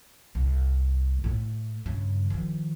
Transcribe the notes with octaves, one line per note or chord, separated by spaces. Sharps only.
C2
A2 A3
G2 C#3
D#3 F3